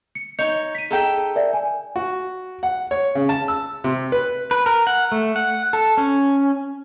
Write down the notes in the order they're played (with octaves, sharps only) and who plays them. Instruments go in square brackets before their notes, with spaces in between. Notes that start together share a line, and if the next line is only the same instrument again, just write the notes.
[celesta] C#7
[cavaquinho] D#4 C#5 [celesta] D#5 G6 C#7
[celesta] B6 D#7
[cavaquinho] D#4 A4 G5 [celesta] G#4 A#5
[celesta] A#4 D5 E5
G#5
[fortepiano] F#4
F#5
C#5
C#3
A5
E6
C3
B4
[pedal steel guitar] B4
A#4
F#5
A3
F#5
A4
C#4